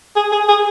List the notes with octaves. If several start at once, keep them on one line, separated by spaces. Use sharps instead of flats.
G#4
G#4
G#4